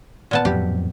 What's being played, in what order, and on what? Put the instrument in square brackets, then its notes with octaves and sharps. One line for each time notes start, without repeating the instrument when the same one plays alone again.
[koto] A#2 B3 A5
[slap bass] F2 A2 F#3 [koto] G4